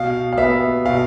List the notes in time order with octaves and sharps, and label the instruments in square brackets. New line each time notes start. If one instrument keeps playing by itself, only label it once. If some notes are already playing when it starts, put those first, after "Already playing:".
Already playing: [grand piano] B2 F5
F5
B3 E5
B2 F5